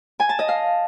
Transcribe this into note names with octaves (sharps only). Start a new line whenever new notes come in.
G#5
A5
D#5
F5